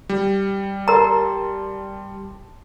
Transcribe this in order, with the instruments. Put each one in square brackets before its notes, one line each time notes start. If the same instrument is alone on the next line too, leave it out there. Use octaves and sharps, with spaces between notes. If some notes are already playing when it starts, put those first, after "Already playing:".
[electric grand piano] G3
[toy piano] A#4 A#5 [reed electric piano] A5 C6